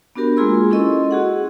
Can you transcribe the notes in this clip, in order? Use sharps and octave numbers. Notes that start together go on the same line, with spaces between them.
B3 D4 F#4 G4 A#4 B5
G#3 A#3 F4 G#4 C6 E6
C#4 E4 A4 D#5 C6 C#6
F#4 G#4 F#5